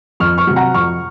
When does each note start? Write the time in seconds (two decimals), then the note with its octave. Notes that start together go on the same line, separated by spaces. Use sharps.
0.20 F2 C#6 F6
0.38 C#6 F6
0.47 C3 F#3
0.56 F#5 A#5
0.74 F2 C#6 F6